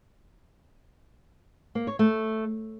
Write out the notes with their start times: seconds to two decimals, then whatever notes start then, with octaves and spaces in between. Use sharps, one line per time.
1.75 A#3
1.87 C#5
1.99 A3